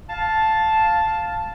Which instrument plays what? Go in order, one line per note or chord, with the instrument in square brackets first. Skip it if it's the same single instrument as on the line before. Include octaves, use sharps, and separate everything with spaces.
[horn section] F5 A5